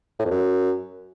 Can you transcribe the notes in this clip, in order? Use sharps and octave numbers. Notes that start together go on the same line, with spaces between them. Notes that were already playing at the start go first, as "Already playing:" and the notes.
A2
F2
F#2